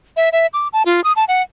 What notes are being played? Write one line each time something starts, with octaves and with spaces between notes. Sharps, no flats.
E5
E5
D6
A5
F4
D#6
A5
F#5